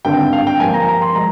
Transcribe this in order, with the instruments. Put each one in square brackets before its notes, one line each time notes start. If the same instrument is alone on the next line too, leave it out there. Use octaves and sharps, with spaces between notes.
[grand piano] G#1 G2 D3 G5
F5
G5
G2 F3 A#3 G#5
A#5
A#5
C6
F3 G#3 A#5